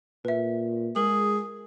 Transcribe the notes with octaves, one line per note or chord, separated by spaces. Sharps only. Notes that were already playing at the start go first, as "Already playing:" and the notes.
A#2 B4 E5
G#3 G#4 A#4 F#7